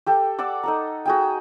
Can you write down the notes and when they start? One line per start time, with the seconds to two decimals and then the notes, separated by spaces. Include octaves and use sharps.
0.07 G4 A4 G5
0.39 D5 F#5 D6 E6
0.63 D#4 A4 A#5
1.05 F#4 G#4 G5